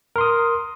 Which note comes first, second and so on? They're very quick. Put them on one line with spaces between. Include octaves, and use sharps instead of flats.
A#4 C6 D#6